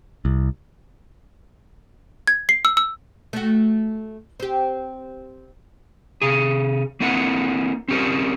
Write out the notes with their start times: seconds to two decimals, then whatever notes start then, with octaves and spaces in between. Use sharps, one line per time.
0.25 C2
2.27 G#6
2.49 C7
2.65 E6
2.77 E6
3.33 A3 F#4
4.40 C4 G4
6.22 C3 G#4
7.00 A#3 C4 E4 A#4 F#5
7.88 C4 C#4 G4 A#4 C5